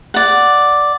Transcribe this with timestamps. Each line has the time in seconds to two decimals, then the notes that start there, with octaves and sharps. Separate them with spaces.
0.14 D5 F#5